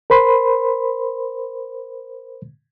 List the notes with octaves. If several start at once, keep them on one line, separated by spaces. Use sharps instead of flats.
A#4 C5 B5 C6